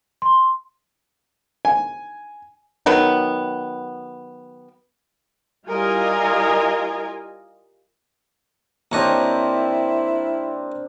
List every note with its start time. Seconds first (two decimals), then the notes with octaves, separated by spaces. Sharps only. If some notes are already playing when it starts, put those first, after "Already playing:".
0.22 C6
1.65 G#5
2.86 D#3 F#3 B3
5.68 G3 E4 F4 A#4 D#5 G#5
8.92 D#2 C4 D4 E4 A#4 C#5 D#5